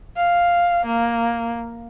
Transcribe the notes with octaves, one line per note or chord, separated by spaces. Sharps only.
F5
A#3